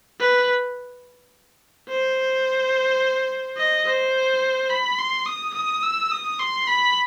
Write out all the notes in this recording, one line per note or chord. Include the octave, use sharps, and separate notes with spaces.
B4
C5
D#5
C5
B5
C6
D#6
D#6
E6
D#6
C6
B5